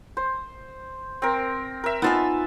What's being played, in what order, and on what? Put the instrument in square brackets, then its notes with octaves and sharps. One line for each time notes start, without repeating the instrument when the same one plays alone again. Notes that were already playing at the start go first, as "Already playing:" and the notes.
[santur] C5
C4 A#4
A#4 E5
[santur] B3 A5 E6 [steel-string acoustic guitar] D#4 F4 G#5